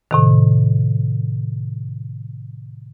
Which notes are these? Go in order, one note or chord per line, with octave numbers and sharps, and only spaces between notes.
A2 C3 D#3